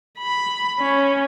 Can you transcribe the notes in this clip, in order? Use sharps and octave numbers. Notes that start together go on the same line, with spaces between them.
B5
C#4